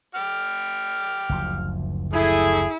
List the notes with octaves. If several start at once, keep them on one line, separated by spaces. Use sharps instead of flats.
G4 F6
F#1 D2 F3
A3 E4 G#4